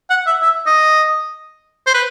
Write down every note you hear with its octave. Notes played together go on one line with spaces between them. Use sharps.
F#5
E5
E5
D#5
C5
B4